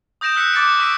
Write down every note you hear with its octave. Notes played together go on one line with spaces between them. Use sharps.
D#6 G6 A#6 D7 E7
E6 F#6 B6 C#7
D6 A6 C#7 D7
C#6 E6 B6 C#7 D7